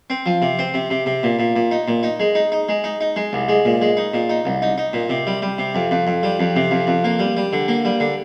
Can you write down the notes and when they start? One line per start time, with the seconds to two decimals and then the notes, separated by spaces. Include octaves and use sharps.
0.10 C4
0.26 F3
0.42 C3
0.59 C4
0.74 C3
0.90 C3
1.06 C3
1.23 A#2
1.39 A#2
1.56 A#2
1.71 D#4
1.88 A#2
2.03 D#4
2.20 G#3
2.35 D#4
2.52 D#4
2.69 G#3
2.84 D#4
3.01 D#4
3.16 G#3
3.33 C2
3.49 G#3
3.65 A#2
3.82 G#3
3.97 D#4
4.14 A#2
4.29 D#4
4.45 C2
4.62 D#4
4.78 D#4
4.93 A#2
5.10 C3
5.27 G3
5.42 G3
5.58 C3
5.75 F2
5.91 F2
6.07 F2
6.23 G3
6.40 F2
6.56 C3
6.71 F2
6.87 F2
7.04 A#3
7.19 G3
7.37 G3
7.53 D3
7.68 A#3
7.85 G3
8.00 D3